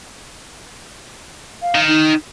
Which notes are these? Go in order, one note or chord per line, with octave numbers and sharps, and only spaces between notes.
F5
D#3
D#4